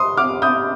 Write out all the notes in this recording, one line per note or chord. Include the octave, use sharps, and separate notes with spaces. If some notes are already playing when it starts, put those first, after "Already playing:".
Already playing: C6 D#6
D6 F6
D#6 G6